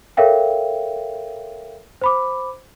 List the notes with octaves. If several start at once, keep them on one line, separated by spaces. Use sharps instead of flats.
A4 A#4 C#5 E5 F5 G5
C5 B5 D6